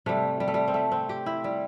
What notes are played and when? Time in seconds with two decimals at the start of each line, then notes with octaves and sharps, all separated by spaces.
0.06 C3 G3 A3
0.40 G3
0.48 A3
0.54 G3
0.68 C4
0.74 A3
0.92 C4
1.09 G4
1.26 E4
1.44 G3